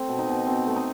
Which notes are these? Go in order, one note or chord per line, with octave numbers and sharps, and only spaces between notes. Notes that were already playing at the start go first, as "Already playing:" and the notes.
Already playing: A3 C4
B2
D#4
B2
B2 C4
A3
D#4